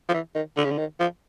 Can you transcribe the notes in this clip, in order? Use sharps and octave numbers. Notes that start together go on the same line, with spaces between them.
F3
E3
D#3
D3
C#3
D3
D#3
F3